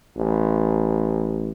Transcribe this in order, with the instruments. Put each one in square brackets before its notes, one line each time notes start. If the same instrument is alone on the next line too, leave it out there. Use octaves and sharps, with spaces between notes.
[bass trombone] A1